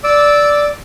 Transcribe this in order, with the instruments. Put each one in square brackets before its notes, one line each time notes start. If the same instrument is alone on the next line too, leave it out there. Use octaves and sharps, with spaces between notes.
[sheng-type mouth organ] D5 D6 E6